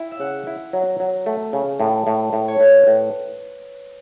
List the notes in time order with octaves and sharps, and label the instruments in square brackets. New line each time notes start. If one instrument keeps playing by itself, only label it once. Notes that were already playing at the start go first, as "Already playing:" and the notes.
Already playing: [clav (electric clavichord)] E4 [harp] G5
[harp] E5
[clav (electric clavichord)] C#3 [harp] F#5
[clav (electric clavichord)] E4
F#3
F#3
A3
C#3
A2
A2
A2
[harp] C#5
[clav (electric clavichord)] A2 [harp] B4
[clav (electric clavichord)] A2